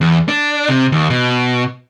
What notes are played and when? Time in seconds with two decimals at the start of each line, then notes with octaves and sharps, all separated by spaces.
0.01 E2
0.28 D4
0.69 C3
0.92 D#2
1.10 B2